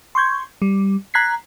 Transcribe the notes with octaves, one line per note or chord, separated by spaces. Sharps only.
C6 C#6 G6 G#6
G3
A#5 F#6 G#6 B6 C7